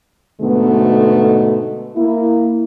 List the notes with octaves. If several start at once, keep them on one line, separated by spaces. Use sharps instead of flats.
G#2 B2 D3 A3 B3
A#3 E4